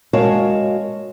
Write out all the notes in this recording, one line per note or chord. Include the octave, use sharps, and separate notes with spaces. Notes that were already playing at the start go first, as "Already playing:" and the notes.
G#3 F#4 A#4 C#5 F5 A5